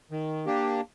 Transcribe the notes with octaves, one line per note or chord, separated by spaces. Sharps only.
D#3
A#3 D4 G4